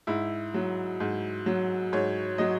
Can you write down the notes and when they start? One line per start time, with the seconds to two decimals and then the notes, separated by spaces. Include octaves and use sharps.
0.07 G#2 E4
0.54 F#3
1.00 G#2
1.46 F#3
1.93 G#2 C#5
2.38 F#3 D#5